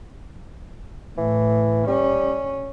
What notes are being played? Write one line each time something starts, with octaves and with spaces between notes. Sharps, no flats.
A2 E3
G3 C#4